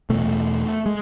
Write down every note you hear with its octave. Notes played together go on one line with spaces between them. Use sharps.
E2 B2 A3
G#3